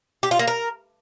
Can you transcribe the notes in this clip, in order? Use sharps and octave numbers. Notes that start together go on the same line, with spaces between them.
G4
F4
A#3
A#4